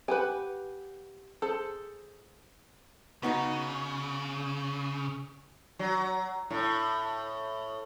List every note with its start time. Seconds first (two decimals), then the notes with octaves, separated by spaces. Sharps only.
0.08 G4 B4 F#5 G#5
1.42 G#4 A4 C5
3.23 C#3 B3 D#4 F#4
5.79 F#3
6.50 A2